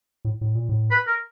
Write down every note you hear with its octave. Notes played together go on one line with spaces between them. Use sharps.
A2
A2
A#2
A2
B4
A#4